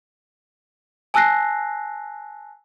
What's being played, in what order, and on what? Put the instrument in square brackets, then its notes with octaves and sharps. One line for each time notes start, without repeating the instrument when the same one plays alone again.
[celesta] G#5 A5 E6 F#6 A#6 C7